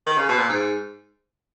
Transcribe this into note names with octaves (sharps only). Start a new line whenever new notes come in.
D#3
C#3
B2
A#2
G#2